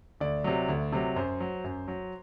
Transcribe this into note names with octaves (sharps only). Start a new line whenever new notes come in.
D2 D5
C3 F#3
D2
C3 F#3
F#2 C5
F#3
F#2
F#3